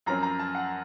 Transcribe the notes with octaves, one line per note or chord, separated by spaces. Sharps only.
F#2 F3 C4 A#5
A#5
A5
F#5